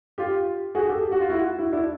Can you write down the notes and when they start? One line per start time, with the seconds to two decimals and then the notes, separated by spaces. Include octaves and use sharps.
0.18 F4 G4
0.75 F#4 G#4
0.89 G4 A4
1.03 G4
1.12 F#4
1.20 F4
1.29 E4 F#4
1.59 E4 F#4
1.73 D4 E4